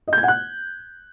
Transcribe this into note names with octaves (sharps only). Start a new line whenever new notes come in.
D#5
G6
G#6
F#5
F#6